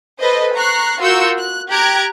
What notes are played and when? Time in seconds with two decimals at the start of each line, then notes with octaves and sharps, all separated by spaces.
0.20 A4 B4 C5 D#5
0.56 A#5 C#6 F#6 C7
1.00 F4 F#4 A#4 E6 G6 C#7
1.38 F#6
1.70 G4 A#5 F#6 G#6 D7